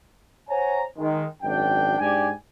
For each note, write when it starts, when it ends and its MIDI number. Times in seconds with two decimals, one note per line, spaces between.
0.50 0.83 72
0.50 0.83 73
0.50 0.83 78
0.50 0.83 80
0.50 0.83 82
0.97 1.24 51
0.97 1.24 56
1.43 1.98 32
1.43 1.98 42
1.43 1.98 62
1.43 1.98 79
1.98 2.31 44
1.98 2.31 62
1.98 2.31 67
1.98 2.31 74
1.98 2.31 80